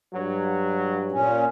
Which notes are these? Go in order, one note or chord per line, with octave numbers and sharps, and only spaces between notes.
G2 F#3
A#2 C#4